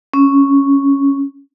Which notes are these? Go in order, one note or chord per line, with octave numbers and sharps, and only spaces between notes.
C#4